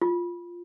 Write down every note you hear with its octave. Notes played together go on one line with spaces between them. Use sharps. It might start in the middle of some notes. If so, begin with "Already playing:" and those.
F4